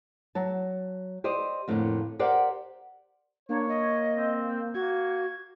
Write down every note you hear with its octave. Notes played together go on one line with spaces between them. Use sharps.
F#3 A5
G4 C5 D5 D#5
F2 A2 D3 G3 A#3
G4 A#4 C5 D5 F5 F#5
A#3 D4 C#5
D#5
C4
A#3 F#4 G#6